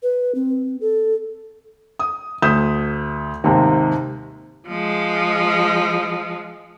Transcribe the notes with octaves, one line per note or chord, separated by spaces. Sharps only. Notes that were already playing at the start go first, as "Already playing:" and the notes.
B4
C4
A4
D#6
D2 D#6 G6 B6 E7
D#2 G#2 C3
F3 G#3